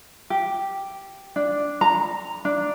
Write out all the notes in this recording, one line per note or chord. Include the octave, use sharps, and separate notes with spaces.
G4
D4
A#5
D4